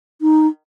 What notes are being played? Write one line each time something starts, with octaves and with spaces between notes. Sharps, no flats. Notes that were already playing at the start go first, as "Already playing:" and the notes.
D#4